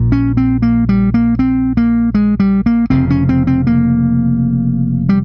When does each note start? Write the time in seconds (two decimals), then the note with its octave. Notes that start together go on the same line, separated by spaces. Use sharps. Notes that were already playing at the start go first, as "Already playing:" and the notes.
Already playing: A#1 A#2
0.12 C#4
0.37 C4
0.62 A#3
0.89 G3
1.14 A#3
1.39 C4
1.77 A#3
2.15 G#3
2.40 G3
2.66 A#3
2.90 F1 F2 C#3 C4
3.10 C#4
3.29 C4
3.47 C4
3.67 A#3
5.09 G3